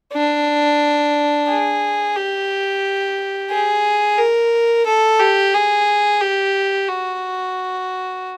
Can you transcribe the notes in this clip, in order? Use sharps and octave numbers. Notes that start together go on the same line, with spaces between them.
D4
G#4
G4
G#4
A#4
A4
G4
G#4
G4
F#4